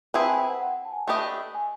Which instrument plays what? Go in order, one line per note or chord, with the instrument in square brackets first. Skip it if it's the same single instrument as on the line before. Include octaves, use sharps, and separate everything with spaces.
[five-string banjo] C4 E4 G#4 B4 [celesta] A5
[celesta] G#5
G5
F#5
F#5
G5
A5
G#5
[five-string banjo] A3 D4 G4 B4 D#5 [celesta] G5
[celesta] G#5